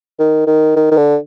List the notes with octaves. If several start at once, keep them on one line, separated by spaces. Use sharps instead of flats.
D#3
D#3
D#3
D#3
D3